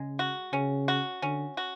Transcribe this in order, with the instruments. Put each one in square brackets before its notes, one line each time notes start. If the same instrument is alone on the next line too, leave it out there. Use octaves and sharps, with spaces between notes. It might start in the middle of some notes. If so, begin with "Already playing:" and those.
Already playing: [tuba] C#3 [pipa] G#3
[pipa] F#4
[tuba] C#3 [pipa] C#4
[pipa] F#4
[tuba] D3 [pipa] C#4
[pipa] F#4